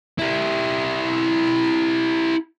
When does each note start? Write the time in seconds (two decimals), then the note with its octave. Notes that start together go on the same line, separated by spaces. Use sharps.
0.19 E4 G4